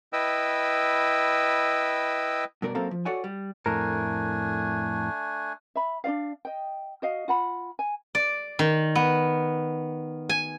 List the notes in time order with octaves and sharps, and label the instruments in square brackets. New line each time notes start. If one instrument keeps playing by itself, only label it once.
[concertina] E4 B4 D#5 G5 E6
[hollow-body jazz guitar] G2 B2 A#4 D5
F#2 A#3 C4 A4 F5 A#5
F3
F#4 A4 C#5 D5 F#5 G#5
G3
[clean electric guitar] F2 A2 A#4 [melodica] A3 D4 G#5
[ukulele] E5 B5
D4 F4 D5 F5
D#5 G5
F#4 D#5 F5
F4 F#5 B5
G#5
[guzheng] D5
D#3
B3
G#5